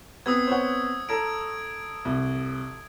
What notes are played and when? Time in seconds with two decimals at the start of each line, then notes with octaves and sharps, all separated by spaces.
0.26 B3 C4 D#6 E6 G#6
0.47 C5 C#5 F#5
1.09 A4 A#5 G#6 D7
2.05 C2